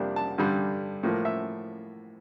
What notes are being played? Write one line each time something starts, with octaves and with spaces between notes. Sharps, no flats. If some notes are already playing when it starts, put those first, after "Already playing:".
Already playing: F2 C3 G3 A#3 D4
A5
G2 D3 G3
A2 F3 A#3
E5